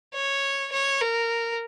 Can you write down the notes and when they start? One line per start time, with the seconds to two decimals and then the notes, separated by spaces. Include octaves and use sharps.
0.13 C#5
0.72 C#5
1.01 A#4